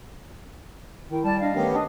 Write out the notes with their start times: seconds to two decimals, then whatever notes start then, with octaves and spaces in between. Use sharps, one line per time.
1.11 D#3 E4 G5
1.24 G3 D5 A5
1.41 D4 D#5 F5
1.55 D#3 A3 B3 C#4 G4
1.74 D4 B4 D#5 D#6